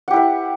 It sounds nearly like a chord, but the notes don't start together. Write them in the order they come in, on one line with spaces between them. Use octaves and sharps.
F#5 G4 E4 B4